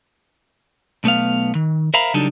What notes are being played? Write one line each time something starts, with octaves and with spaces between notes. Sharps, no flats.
B1 A3 B3 F5
D#3
A#4 C5 E5 F5 A#5 B5
C#3 F#3 G3 D4 D#4 A4